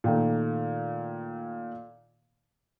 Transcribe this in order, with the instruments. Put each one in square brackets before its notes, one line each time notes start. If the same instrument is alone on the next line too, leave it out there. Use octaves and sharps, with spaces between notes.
[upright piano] A#2 D#3 A3